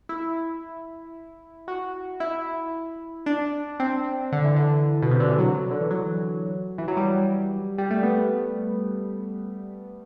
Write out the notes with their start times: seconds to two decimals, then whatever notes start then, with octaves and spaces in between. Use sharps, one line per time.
0.09 E4
1.68 F#4
2.20 E4
3.26 D4
3.80 C4
4.32 D3
4.44 E3
4.56 D3
5.02 B2
5.11 C3
5.20 D3
5.29 E3
5.38 F#3
5.71 D3
5.81 E3
5.91 F#3
6.78 E3
6.88 F#3
6.97 G3
7.78 G3
7.91 A3
8.03 B3